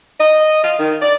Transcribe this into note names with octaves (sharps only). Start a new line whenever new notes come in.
D#5
F4
D#3
D5